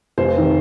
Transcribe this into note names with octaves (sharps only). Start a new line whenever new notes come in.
F1 C5
D#3